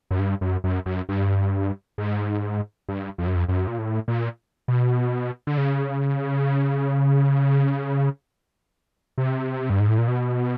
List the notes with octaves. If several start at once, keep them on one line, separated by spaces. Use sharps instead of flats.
F#2
G2
F#2
F#2
F#2
G2
G#2
G2
F2
F#2
F2
F#2
A#2
A2
A#2
B2
D3
C#3
C3
G2
G#2
A2
A#2
B2